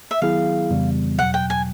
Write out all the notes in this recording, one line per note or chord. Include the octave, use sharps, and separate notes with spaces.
E5
D#3 F#3 B3 E4 G#4 F5
F2 C#3 E3 G3 B3
E2 B2 F#3 F#5
G5
G#5